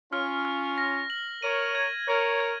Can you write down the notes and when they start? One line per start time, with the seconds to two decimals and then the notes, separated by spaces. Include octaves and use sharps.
0.12 C#4 F4 F6
0.45 F6
0.78 A#6
1.10 F#7
1.42 A#4 C#5 D#7
1.75 G#6
2.08 A#4 C#5 G#6
2.40 G#6